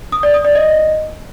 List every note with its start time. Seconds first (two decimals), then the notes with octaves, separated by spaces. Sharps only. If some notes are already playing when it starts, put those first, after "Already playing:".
0.12 D#6
0.23 D5
0.34 D#6
0.45 D5
0.55 D#5